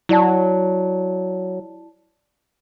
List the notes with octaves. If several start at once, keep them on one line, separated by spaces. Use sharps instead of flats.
F#3 E4 D5 A5